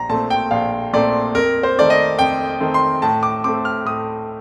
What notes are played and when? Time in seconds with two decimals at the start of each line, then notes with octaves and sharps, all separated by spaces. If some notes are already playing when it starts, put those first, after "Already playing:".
Already playing: A#1 A#5
0.10 A#2 A3 C4 A5
0.30 G5
0.51 A#1 F5
0.93 A#2 A3 C4 D5
1.35 F2 A#4
1.63 C5
1.76 D#3 A3 C4 D5
1.90 D#5
2.19 F2 G5
2.60 D#3 A3 C4
2.74 C6
3.02 A2 A5
3.23 D6
3.44 A3 C4 D6
3.65 F6
3.85 A2 D#6